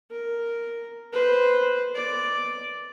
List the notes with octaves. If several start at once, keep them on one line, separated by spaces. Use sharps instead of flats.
A#4
B4 C5
D5